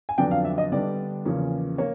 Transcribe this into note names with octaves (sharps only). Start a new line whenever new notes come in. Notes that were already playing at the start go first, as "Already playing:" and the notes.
G#5
F2 D3 F#3 B3 D4 G5
F5
E5
D#5
D3 G3 B3 D4 D5
E2 C#3 F3 A#3 C#4
A#3 C#5